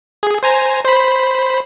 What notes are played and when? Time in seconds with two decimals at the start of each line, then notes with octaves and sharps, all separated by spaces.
0.23 G#4
0.43 C5 G#5 A#5
0.85 C5 B5